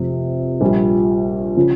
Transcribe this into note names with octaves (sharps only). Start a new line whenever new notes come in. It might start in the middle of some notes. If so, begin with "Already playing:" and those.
Already playing: F1 F2 C3
A#1 A#2 G3
C#3 F3